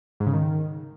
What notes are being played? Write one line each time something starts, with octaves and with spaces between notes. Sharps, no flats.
G#2
C#3
D#3